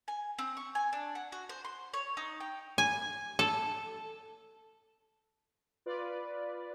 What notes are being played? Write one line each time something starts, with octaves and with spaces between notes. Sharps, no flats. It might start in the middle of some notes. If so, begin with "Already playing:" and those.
G#5
C4
C#6
G#5
D4
F#5
F#4
C5
C6
C#5
D#4
G5
G#5
A4
F4 B4 D5